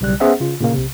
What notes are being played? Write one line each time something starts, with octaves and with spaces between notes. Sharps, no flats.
B1 C#3 G3 F#6
B3 C#4 G#4 C5 E5 F#5
C#3 F4
A#2 C#3 A#3
B1 C3